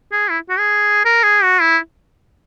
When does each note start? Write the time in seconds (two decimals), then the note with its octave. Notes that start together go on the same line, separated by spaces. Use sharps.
0.12 G#4
0.30 E4
0.49 F#4
0.58 G#4
1.05 A#4
1.23 G#4
1.43 F#4
1.61 E4